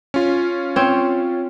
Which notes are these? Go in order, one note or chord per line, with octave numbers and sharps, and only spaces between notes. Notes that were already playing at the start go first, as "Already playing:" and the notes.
C#4 F4
C4 C#5